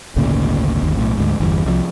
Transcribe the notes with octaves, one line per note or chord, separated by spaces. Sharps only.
G#1 D2 A#2 C#3
G1 D#2
B1 A2
D2 G#2
G1 E2
C2 F3